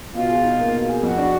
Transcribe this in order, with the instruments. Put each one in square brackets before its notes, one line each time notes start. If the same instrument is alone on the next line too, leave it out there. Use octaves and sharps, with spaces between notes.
[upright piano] B2 [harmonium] F4
[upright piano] G#4
D#4
A#3
B2
G#4
[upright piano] F2 [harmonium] F#4
[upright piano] D4